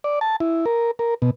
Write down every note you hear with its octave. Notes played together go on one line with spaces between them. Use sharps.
D5
A5
E4
A#4
A#4
B2